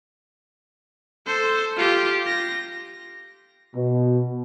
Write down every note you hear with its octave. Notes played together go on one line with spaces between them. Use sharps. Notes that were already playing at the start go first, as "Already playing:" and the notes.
A4 C5
F4 G4
A#6
B2